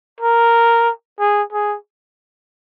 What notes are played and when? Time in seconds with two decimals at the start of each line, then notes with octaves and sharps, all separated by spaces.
0.21 A#4
1.19 G#4
1.53 G#4